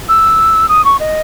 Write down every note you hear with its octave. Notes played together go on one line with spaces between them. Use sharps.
E6
D#6
C#6
D#5